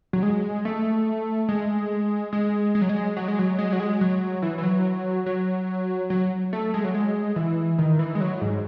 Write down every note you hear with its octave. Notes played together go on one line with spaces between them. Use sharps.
F#3
G#3
A3
G#3
G#3
G#3
F#3
G#3
F#3
G#3
F#3
G#3
F#3
G#3
F#3
E3
E3
F#3
F#3
F#3
A3
G#3
F#3
G#3
E3
D#3
E3
G#3
F#3
G#2